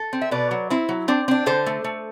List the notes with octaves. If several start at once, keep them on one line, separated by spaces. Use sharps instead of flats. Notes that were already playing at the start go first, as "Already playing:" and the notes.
Already playing: A4
C4
E5
B2 B4 D5
F#3
C4 E4
F#3
C4 D4
C4 D4
D3 A4 C5
A3
A3